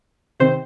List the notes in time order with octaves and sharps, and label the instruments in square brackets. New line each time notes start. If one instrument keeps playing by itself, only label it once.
[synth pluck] C3 D#3 C4 C5